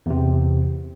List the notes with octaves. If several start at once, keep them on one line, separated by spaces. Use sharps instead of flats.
E2 C3